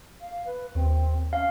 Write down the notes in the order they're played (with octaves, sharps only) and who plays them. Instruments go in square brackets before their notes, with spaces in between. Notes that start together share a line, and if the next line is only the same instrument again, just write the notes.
[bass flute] F5
B4
[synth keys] D#2 [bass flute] C4
[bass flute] C#4 [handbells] F5